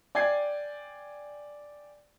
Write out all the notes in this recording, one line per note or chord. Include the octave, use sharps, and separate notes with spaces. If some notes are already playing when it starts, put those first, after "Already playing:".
D5 G5 G#5 G#6 C7